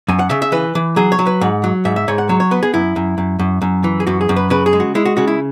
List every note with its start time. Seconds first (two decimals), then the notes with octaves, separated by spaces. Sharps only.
0.08 F#2 G#5
0.19 F#5
0.30 C#3 E5
0.42 E5
0.52 E3 B4
0.75 E3
0.96 F#3 G#4
1.12 C#5
1.19 F#3
1.27 B4
1.41 G#2 F#5
1.64 F#3
1.85 G#2 E5
1.96 E5
2.08 G#2 C#5
2.18 F#5
2.29 F#3 C#5
2.40 C#5
2.51 B3 B4
2.63 G#4
2.74 F#2 E4
2.96 F#2
3.18 F#2
3.39 F#2
3.62 F#2
3.84 E3
4.00 G#4
4.07 F#2 F#4
4.21 G#4
4.29 F#2
4.36 B4
4.50 C#3 B4
4.66 G#4
4.73 G#3
4.80 F#4
4.95 G#3 E4
5.05 F#4
5.17 C#3 F#4
5.27 E4